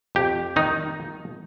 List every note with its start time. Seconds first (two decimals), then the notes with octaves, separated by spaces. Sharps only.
0.15 F2 G4
0.56 D#3 D#4